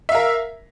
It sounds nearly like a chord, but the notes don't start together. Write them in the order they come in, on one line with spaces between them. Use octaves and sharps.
E5 F5 A#4